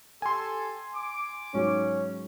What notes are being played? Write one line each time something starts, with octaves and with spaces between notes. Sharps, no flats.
G4 A4 G#5 C6
D6
G#2 F#3 C#4